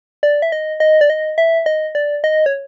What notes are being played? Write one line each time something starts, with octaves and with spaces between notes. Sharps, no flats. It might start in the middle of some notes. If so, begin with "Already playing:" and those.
D5
E5
D#5
D#5
D5
D#5
E5
D#5
D5
D#5
C#5